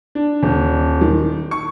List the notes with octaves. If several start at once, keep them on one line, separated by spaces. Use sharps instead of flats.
D4
D#1
D#3
C#6